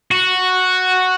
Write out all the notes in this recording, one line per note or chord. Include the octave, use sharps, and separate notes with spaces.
F#4